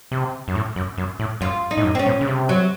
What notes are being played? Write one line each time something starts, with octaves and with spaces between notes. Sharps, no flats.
C3
F#2
A2
F#2
F#2
A2
F#2 F4
D#4
A2
F#2
C4
C#4
A#2
C#3
C3
F#3